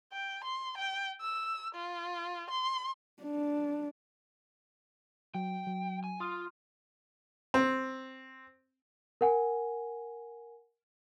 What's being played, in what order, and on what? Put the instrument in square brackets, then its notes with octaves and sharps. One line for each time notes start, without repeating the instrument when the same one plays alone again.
[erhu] G5
C6
G5
E6
F4
C6
[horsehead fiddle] D4
[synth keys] F#3 [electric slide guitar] G5
[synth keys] F#3
[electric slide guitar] G#5
[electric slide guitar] F4 [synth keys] C6 D#6 F6
[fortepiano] C4
[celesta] A#4 F#5 G#5